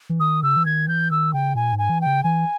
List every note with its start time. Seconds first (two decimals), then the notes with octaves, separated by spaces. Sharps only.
0.09 E3
0.20 D#3 D#6
0.43 C#3 E6
0.57 E3
0.66 D#3 G#6
0.87 E3 G6
1.11 D#3 E6
1.33 C#3 G5
1.55 A#2 G#5
1.73 G#2
1.79 G#5
1.90 E3
2.01 G5
2.06 C#3
2.23 E3 G#5